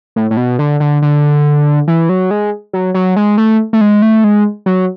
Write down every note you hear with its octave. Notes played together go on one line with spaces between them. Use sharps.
A2
A2
B2
D3
D3
D3
E3
F#3
G#3
F#3
F#3
G#3
A3
A3
G#3
A3
G#3
F#3